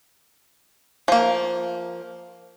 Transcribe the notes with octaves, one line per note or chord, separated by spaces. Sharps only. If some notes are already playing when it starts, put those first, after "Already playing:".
F3 A#3